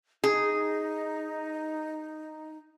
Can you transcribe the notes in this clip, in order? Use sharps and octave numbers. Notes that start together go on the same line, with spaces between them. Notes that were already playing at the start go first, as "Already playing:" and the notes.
D#4 G#4